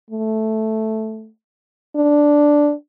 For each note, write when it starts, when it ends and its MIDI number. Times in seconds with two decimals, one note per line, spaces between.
0.11 1.28 57
1.96 2.73 62